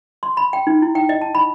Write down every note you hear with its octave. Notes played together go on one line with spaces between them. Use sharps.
C6
B5
G5
D#4
E4
G5
D#5
A5
B5